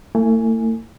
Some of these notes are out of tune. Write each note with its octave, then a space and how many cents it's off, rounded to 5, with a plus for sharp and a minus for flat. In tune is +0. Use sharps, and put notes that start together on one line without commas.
A3 +40 E4 +0 G#5 +0